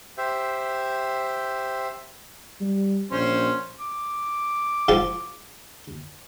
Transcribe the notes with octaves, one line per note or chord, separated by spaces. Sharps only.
G4 C5 E5
G3
A#1 C#4 C5 C6
D6
G#2 F3 D5